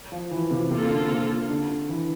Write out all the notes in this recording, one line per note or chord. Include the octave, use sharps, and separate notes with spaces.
F3
E3
C3
C3 A#3 F4 A4
D3
C3
D3
E3